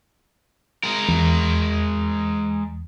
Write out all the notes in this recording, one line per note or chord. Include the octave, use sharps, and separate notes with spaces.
G#3 A#4
E2